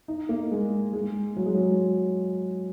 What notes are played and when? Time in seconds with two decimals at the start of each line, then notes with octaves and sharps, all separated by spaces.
0.08 D#4
0.29 A#3
0.51 G#3
0.93 G#3
1.37 F#3
1.46 G#3
1.54 F#3